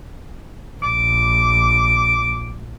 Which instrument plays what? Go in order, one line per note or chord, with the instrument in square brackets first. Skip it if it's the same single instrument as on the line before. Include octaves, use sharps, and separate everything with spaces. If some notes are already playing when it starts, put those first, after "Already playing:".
[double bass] A#1 [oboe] D6